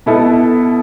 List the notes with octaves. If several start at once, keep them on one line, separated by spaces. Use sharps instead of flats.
B2 B3 E4 A4